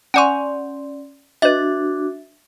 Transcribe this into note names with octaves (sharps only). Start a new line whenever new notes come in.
C#4 D5 F#5 G#5 C6 C#6
D4 F#4 B4 D#5 E5 A6